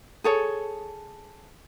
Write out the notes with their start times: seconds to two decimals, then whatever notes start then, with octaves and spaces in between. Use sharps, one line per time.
0.24 G#4 A4 C#5